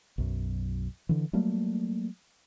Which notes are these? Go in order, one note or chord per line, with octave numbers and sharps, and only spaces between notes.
B1 F#2
D3 E3
F#3 G3 A3 A#3